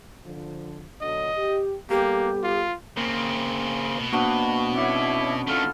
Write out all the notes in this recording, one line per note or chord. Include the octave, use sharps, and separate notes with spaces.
D3 F3
B2 D3 F#3 D#5
G4
G3 A#3 B3 G4 A4
F4
C#3 A#3 C4
B2
A#3 B3 D4 F#4 C5 C#6
C4 C#4 E4 C#5 F#5 D6
D#3 A3 F4 A4 F6